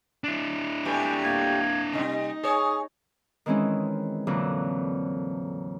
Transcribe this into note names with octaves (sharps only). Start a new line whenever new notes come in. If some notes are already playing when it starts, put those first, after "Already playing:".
D4 E4
G3 A3 B3 G#5
A#3 G#6
C3 G3 D#4 D#5
G#4 C#5 D#6
D#3 E3 G#3 C4 C#4 E4
F2 A#2 D3 E3 F#3